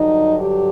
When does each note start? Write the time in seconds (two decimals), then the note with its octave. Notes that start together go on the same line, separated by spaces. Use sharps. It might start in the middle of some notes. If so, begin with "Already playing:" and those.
Already playing: G2 D3 F#3 D#4
0.41 G4